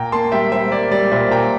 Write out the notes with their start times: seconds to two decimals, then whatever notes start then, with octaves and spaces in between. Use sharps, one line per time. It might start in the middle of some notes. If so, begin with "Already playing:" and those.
Already playing: A#2 G5 A#5
0.12 A#3 A5 C6
0.32 G3 E5 G5
0.52 G3 C5 E5
0.71 A#3 D5
0.91 G3 D5
1.11 A#2 C5 E5
1.31 A#2 G5 A#5